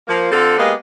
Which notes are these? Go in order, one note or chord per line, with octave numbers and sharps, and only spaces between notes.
F3 A#3
D3 C4 F4 A4
G#3 A#3 B3 G4 D#5 F5